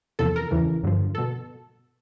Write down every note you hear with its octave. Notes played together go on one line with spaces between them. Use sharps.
E2 C3 F3 A4
A#4
E2 C#3 E3
G2 D3 F3
B2 A4